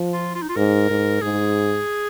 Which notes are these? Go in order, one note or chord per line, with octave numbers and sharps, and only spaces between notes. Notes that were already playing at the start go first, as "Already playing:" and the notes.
Already playing: F3
F4
F4
D#4
F4
G#2 A#4
G#2
G#2 G#4